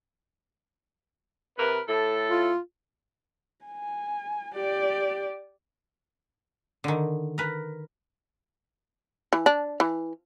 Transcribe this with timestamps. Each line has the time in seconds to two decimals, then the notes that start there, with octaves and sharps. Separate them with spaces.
1.58 C3 A#4 B4
1.87 A2 A4
2.30 F4
3.65 G#5
4.55 G4 D5
6.84 D3 D#3
7.38 A#4 B4
9.33 E3
9.46 D4
9.80 E3